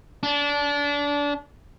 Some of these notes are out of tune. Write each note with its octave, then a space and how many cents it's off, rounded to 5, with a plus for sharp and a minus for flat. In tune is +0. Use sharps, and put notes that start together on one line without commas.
D4 -25